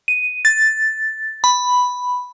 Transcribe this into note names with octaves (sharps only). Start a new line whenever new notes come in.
D#7
A6
B5